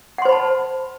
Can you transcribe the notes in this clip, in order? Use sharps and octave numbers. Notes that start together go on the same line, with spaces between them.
C5 F#5 A5 B5 C6